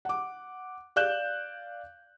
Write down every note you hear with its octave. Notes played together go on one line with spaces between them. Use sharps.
F#5 D6
D5 F5 F#6 G6 E7